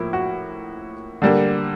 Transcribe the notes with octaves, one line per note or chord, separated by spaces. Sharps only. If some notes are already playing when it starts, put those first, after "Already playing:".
Already playing: A2 F3 A#3 E4
F#4
D3 G3 A#3